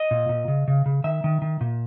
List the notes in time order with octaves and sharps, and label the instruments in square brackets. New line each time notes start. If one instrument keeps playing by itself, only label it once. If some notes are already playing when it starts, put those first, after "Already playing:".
Already playing: [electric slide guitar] D#5
A#2
A#2
C#3
C#3
C#3
D#3 E5
D#3
D#3
A#2